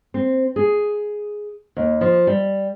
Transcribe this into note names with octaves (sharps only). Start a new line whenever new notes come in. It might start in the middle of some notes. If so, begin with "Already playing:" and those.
C4
G#4
D#2
F3
G3